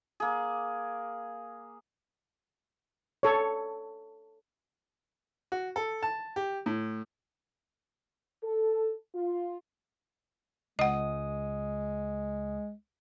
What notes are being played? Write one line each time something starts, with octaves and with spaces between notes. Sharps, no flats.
A#3 G#4
A4 C#5
F#4
A4
A5
G4
A2
A4
F4
C#2 G#3 D#5 F#5 D#6